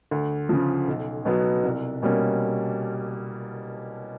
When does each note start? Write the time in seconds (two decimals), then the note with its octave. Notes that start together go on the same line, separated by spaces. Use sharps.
0.11 D2
0.49 C#3 F3
0.88 B1
1.25 B2 F#3 B3
1.63 C2
2.03 B2 G3 A#3 C#4